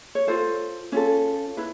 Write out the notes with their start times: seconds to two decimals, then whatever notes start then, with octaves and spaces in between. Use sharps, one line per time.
0.15 C#5
0.27 F4 A4 C5
0.92 C#4 F4 A4
1.57 E4 B4